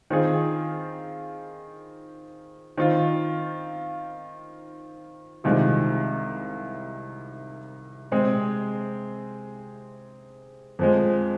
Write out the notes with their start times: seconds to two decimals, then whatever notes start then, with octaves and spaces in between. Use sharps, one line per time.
0.10 D#3 C4 F4 G#4
2.78 D#3 C4 F4
5.44 C2 C3 D#3 G#3 F4
8.12 C3 G#3 C4 G#4
10.79 F2 F3 G#3